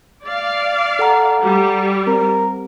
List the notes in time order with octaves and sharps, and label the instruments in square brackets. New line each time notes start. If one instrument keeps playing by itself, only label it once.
[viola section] D5 F5
[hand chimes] A4 F#5 A#5
[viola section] G3
[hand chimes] C4 [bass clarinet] A#4